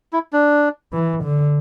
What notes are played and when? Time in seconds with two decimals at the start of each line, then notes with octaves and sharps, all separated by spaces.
0.13 E4
0.33 D4
0.93 E3
1.23 D3